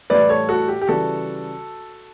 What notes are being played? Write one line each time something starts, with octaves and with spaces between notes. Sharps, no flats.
A2 E3 G3 B4 D5
A4 C#5
F#4 A4
G4
G4
C#3 E3 G3 F#4 A4